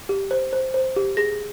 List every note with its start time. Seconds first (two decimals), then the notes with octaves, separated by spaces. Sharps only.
0.09 G4
0.31 C5
0.53 C5
0.74 C5
0.96 G4
1.17 G#4 A#6